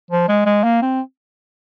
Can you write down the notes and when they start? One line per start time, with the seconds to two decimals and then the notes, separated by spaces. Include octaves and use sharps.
0.10 F3
0.28 G#3
0.46 G#3
0.64 A#3
0.82 C4